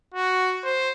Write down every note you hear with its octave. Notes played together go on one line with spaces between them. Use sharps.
F#4
C5